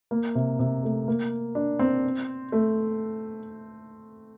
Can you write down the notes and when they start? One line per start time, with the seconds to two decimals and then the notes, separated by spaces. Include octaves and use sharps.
0.11 A#3
0.35 C3
0.59 C3
0.84 A3
1.08 A#3
1.55 D4
1.79 C4
2.52 A3